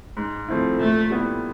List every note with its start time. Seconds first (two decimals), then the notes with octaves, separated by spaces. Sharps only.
0.17 G#2
0.48 F3 A3 C4 E4
0.79 A#2 A3
1.10 G3 B3 E4